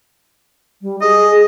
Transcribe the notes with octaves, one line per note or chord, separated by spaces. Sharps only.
G3
G#4 D#5